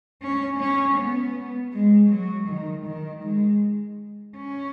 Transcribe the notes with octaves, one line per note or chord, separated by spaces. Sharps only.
C#4
C#4
B3
G#3
F#3
D#3
D#3
G#3
C#4